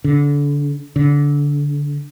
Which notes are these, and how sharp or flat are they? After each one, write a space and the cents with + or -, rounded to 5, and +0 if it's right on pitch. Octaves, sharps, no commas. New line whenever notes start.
D3 -25
D3 -20